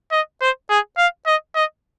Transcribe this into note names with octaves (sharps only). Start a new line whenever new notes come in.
D#5
C5
G#4
F5
D#5
D#5